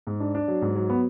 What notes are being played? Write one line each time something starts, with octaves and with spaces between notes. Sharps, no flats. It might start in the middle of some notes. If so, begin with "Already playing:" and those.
G#2
D4
D4
F#3
G#2
F#3
B3